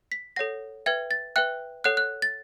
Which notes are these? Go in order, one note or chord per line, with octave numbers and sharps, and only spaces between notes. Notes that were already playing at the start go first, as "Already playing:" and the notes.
B6
A4 C#5 F#5 A#6
B4 E5 G5 G#6
A6
B4 E5 G5 F#6
A4 C#5 F#5 F#6
F#6
A6